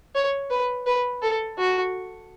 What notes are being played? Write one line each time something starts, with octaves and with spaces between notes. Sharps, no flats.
C#5
B4
B4
A4
F#4